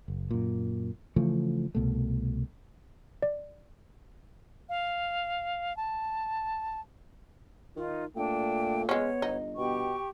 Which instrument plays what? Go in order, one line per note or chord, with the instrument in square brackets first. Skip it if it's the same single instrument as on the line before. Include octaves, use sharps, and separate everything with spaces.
[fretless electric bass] F#1
F#2 A#2
C#3 E3 F3 A3
C2 B2 A3
[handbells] D5
[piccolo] F5
A5
[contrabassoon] D#3 [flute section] D#4 F4
[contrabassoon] A#2 [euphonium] A3 [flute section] D4 G5
[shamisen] G#3 C#4 [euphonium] B3 [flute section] C#5
[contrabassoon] G1 [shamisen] D#4
[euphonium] B2 [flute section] G4 G5 C#6